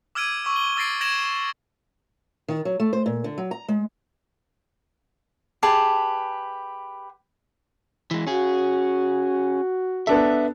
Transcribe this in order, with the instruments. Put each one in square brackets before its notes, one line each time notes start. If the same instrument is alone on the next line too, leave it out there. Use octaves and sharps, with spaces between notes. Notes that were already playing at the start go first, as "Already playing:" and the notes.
[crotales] D6 E6 F6 G#6 D7 D#7
C#6 D6 E6
G7
D6 E6 A6 A#6 C7 D7
G#6 A#6 D7 E7 F#7
[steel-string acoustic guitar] D#3
F#3
A3
C5
A#2
D3
F#3
A#5
G#3
[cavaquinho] G4 G#4 B4 A5
[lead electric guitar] E3 G#3
[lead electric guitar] C#4 G#4 [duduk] F#4
[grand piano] B3 D4 A4 [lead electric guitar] E5